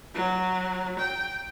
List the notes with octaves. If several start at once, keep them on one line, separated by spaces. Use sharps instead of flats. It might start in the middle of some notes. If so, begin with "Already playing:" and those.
F#3
G5